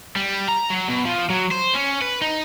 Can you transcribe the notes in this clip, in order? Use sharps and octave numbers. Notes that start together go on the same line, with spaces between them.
G3
A#5
F#3
B2
F3
F#3
C5
C#4
B4
D#4